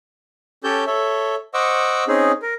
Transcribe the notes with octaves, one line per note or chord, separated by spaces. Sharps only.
C#4 G4 A4 C#5 A5 G6
A4 C#5 E5
C5 D#5 F#5 C#6 D6 E6
C4 C#4 D#4 G#4
A#4